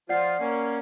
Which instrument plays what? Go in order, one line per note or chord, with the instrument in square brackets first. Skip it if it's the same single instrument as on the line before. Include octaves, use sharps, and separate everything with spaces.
[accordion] F3 F4 [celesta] D5 F#5 C7
[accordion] A#3 C#4